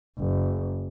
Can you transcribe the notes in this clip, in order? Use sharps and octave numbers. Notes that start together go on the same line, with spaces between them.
F#1